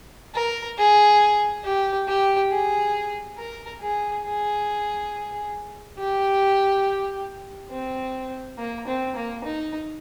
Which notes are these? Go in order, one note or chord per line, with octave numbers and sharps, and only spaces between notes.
A#4
G#4
G4
G4
G#4
A#4
G#4
G#4
G4
C4
A#3
C4
A#3
D#4